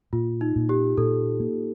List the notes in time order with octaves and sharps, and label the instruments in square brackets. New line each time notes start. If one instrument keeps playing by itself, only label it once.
[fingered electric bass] A#2 [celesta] F4
[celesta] D#4
[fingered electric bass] A#2
[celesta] G4
[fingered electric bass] A#2 [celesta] A4
[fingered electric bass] A#3